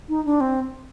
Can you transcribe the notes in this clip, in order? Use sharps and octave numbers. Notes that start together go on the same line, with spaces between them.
D#4
D4
C4